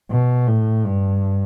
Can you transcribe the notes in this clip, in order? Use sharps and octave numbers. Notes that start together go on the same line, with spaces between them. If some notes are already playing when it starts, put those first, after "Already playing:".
B2
A2
G2